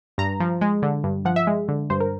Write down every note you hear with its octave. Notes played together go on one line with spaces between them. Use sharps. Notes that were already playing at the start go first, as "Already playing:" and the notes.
G2 A#5
F3
G#3
D3
G2
F3 F#5
E5
G#3
D3
G2 C5
A#4